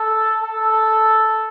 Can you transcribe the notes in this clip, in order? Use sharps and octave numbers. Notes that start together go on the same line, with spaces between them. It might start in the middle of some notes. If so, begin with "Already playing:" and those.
Already playing: A4
A4